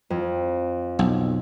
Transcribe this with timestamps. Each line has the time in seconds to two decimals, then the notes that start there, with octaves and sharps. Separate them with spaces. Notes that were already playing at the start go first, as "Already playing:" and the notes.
0.10 F2
0.99 B1